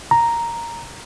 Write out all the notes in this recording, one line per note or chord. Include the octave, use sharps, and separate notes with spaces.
A#5